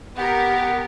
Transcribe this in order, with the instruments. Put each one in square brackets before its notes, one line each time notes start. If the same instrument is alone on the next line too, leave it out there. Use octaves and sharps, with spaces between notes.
[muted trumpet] B3 [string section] G4 A#4 [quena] F#5